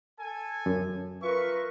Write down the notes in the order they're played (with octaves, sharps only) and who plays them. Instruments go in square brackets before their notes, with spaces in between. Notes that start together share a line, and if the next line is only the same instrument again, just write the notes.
[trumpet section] A4 G#5
[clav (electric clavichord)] F#2
[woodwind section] F4 A#4 B4 [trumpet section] E5 C#6